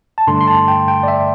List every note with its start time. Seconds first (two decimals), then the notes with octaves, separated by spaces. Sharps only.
0.18 A5
0.27 G2 D3 A3 C6
0.41 C6
0.47 A5
0.68 G5
0.88 G5
1.03 D5
1.08 E5